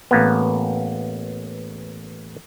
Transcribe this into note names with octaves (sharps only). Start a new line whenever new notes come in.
A1 A#3 B3